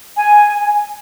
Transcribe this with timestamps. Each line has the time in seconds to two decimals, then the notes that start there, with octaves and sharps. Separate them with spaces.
0.16 G#5